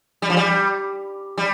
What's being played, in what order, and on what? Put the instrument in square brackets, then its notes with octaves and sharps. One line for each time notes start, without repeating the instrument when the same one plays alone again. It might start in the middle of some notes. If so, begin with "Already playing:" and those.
[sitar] G3
F3
G3
G3